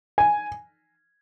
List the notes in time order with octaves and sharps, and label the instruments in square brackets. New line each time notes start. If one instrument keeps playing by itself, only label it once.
[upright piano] G#5